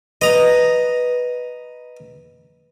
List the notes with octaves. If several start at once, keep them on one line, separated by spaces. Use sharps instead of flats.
B4 D#5 A#5